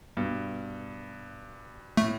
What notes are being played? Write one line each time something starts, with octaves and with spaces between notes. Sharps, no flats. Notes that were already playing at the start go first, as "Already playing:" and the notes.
G2 B2
A2 A3